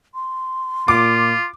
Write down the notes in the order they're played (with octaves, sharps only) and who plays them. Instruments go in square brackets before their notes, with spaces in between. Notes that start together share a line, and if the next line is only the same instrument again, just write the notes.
[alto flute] C6
[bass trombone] A#2 [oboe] F4 [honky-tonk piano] D6